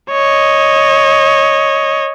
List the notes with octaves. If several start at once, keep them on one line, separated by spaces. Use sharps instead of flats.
C#5 D#5